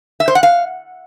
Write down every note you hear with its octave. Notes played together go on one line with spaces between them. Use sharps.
E5
C5
F#5
F5